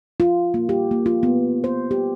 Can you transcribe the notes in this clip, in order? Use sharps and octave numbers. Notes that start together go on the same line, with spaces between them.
F4
A#3
G4
A#3
F4
B3
C5
G4